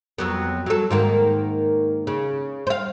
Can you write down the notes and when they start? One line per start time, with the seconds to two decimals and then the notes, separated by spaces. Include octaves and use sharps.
0.18 F2 F#3 B3
0.66 F#3 A4
0.90 G#2 D#3 A#3
2.07 C#3
2.67 C5 F5